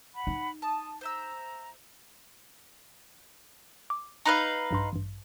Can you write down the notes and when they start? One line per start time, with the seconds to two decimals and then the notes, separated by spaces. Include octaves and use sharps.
0.14 F#5 B5
0.27 D#4
0.62 A5 D#6
1.01 C5 E5 A#5 E6
3.90 D6
4.25 D#4 B4 F5
4.71 A#1 G2 C6
4.93 A1 G2